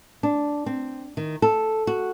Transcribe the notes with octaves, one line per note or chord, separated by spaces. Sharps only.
D4
C4
D#3
A4
F#4